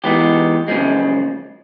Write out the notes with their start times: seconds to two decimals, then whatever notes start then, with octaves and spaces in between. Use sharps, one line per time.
0.04 E3 G#3 B3 D#4 G4
0.68 F#2 C#3 F3 G#3